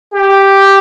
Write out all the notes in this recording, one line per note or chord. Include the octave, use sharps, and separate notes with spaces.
G4